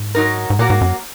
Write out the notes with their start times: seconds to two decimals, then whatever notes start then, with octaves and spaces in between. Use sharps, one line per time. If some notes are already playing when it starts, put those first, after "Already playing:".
Already playing: G#2
0.15 F#3 D#4 A#4
0.50 G#2
0.59 A#2 F#3 A#3 F#4 A#4
0.70 G#2
0.81 F#2